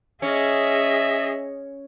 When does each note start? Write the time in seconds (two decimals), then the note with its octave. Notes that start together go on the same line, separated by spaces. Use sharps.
0.22 C#4 G#4 D#5 E5